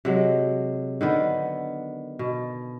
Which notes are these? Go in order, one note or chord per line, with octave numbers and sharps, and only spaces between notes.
C3 F#3 G#3
D3 D#3 B3
B2